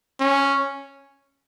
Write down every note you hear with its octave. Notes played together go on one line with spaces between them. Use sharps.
C#4